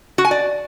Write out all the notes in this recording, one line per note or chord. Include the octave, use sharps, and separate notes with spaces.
F#4
G#5
D5